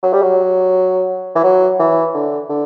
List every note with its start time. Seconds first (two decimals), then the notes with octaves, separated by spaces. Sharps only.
0.03 F#3
0.13 G3
0.22 F#3
1.35 E3
1.44 F#3
1.79 E3
2.14 D3
2.49 D3